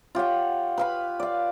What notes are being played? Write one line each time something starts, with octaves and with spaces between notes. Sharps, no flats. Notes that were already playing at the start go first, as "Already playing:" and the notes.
F4 G4 C#5 F#5
B4 F5 B5
D5 F5